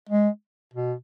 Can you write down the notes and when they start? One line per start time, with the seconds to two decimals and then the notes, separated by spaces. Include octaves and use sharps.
0.09 G#3
0.74 B2